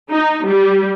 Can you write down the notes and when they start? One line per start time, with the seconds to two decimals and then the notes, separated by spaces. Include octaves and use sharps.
0.11 D#4
0.47 G3